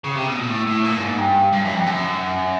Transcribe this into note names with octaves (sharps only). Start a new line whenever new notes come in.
C#3
C3
B2
A#2
A2
A2
A#2
G2
G#2
G2
G2
F#2
F2
F#2